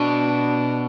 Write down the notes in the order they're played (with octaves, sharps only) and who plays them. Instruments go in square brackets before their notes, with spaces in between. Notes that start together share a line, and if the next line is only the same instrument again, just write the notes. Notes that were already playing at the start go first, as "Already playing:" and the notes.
Already playing: [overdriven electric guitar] B2 [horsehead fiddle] D4